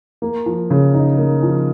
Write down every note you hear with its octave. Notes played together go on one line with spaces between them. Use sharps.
A#3
F3
C#3
D#4
A#3
F3